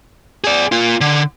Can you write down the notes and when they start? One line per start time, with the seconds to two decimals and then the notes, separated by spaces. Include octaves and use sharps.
0.44 G#4 D5
0.72 A#3 F4
1.01 D3